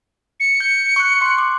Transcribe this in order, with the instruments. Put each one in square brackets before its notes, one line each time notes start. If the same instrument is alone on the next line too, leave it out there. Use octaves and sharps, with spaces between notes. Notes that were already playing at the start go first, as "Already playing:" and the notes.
[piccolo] C#7
[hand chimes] G6
C#6 F#6
C6 F#6
D6